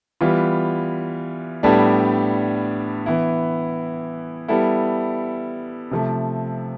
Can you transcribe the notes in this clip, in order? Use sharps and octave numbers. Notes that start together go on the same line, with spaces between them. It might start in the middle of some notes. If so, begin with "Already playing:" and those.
E3 G3 B3 F4
A2 G3 B3 D4 A4
E3 B3 E4
G3 B3 E4 A4
C3 F3 A3